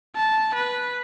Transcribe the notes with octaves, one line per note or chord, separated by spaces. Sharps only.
A5
B4